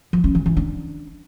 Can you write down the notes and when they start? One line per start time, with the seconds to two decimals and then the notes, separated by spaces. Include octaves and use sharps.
0.13 F3
0.24 C#4
0.35 E3
0.46 E3
0.57 D4